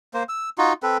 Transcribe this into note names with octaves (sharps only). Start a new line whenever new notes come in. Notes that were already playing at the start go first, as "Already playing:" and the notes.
A#3 C5
E6
D#4 F4 F#4
C4 A4 B4